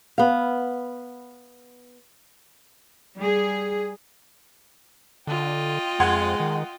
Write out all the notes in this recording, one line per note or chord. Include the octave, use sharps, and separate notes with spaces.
B3 F5
G3 G#4
D3 F4 D#5 G5
F2 G#3 F#5 C6 G#6
D#3